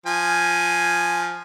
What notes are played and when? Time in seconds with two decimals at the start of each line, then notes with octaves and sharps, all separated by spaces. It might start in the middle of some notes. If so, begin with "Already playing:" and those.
0.06 F3 G#5